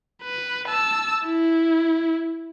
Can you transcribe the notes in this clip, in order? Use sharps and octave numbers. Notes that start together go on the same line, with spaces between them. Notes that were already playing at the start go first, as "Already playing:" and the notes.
B4
A5 E6
E4